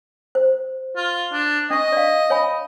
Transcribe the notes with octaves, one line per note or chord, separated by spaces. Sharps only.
C5
F4
D4
D4 D#5 C#6
D5 F5
C#5 G#5 B5